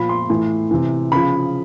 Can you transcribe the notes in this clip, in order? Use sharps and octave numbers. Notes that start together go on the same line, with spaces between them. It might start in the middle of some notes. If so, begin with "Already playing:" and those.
Already playing: A#2 F3 B5
C6
A2 E3
C3 E3
C#3 F3 B5